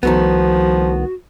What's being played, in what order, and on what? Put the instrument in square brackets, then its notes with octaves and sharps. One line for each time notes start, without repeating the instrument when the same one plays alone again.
[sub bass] C2 [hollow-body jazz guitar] D#3 A3 B3 [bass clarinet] F3 [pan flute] F#4